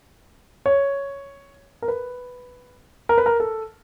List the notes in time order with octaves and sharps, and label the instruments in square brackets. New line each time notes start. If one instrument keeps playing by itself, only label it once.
[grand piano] C#5
A#4
B4
A#4
B4
A#4
A4